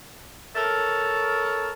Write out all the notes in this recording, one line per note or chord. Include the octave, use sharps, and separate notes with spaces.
A4 A#4 C#5